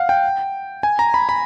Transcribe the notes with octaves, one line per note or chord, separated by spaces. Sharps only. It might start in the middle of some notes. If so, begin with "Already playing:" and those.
Already playing: F5 F#5
G5
G#5
A#5
B5
B5